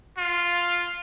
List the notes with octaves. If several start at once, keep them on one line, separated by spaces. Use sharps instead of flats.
F4